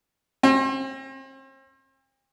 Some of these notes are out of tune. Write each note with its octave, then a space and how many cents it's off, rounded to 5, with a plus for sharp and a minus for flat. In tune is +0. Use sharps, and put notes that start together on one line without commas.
C4 +40